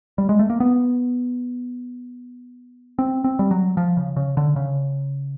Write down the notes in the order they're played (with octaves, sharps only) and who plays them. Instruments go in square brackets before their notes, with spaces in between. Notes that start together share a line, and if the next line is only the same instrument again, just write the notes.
[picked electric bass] G3
G#3
A3
A#3
B3
C4
C4
G3
F#3
F3
C#3
C#3
D3
C#3